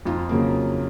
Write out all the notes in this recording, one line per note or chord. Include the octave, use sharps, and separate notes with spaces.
F2 D#4 F4
C#3 F#3 A#3